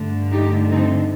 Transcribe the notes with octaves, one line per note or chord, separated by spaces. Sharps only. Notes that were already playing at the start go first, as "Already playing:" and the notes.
Already playing: G2 D3 A3
D#4 G4
C4 D#4